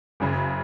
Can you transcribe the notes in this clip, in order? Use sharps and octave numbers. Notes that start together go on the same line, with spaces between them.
F#1 F#2 C#3